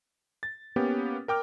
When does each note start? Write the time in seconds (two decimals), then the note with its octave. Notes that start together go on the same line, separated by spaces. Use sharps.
0.43 A6
0.76 A#3 B3 C#4 G4
1.28 A#4 G5 D6 F6